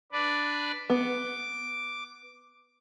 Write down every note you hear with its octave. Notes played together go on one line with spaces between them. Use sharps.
D4 B4 D5
B3 D6